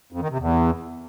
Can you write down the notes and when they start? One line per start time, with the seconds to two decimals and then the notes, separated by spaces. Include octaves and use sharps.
0.12 F2
0.21 D#3
0.30 C3
0.39 E2